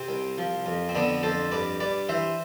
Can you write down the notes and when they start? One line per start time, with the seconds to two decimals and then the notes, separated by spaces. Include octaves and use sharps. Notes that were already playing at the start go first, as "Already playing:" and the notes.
Already playing: C3 C4
0.09 C2
0.38 F3
0.66 F2
0.89 C4
0.95 D3 B3 D4
1.23 F2 A4 C5
1.51 G2 B4 D5
1.80 G2 B4 D5
2.09 E3 C5 E5